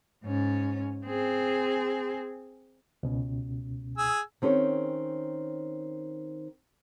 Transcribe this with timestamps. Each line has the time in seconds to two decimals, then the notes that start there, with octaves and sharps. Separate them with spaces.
0.24 G#2 C#4
1.06 C4 G#4
3.03 C#2 B2 C#4
3.98 G#4 G#5 E6
4.42 D#3 C4 C#4 G#4 C#5